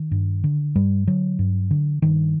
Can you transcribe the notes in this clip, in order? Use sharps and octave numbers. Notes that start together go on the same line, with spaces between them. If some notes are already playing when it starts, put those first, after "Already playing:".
Already playing: D#3
G2
D3
G2 G3
D3 F#3
G2
D3
G2 D#3